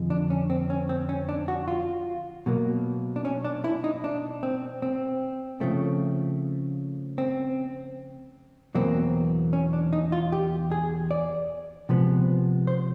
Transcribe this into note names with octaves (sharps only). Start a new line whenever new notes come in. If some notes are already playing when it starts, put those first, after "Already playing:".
Already playing: F2 D3 F3 G#3
D4
C#4
C4
C#4
C4
C#4
D4
F#4
F4
B2 F#3 A#3
D4
C#4
D4
E4
D#4
D4
C4
C4
C#3 F3 A3 C4
C4
E2 B2 F#3 A#3 C4
C#4
D4
D#4
F4
G4
G#4
D5
C3 F3 G#3 B3
C5